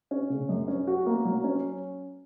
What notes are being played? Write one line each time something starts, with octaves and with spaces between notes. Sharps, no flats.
C#4
C#3
F#2
C#4
F#4
A#3
F#3
C#4